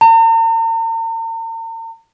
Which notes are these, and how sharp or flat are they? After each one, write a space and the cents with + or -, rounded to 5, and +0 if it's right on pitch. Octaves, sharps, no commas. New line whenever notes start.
A#5 -45